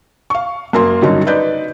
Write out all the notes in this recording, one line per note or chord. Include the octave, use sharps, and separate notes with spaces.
F5 C#6
F#2 A#3 A#4 C6
G2 D3 F#3 C#4 D#4
D#4 B4 D5 G6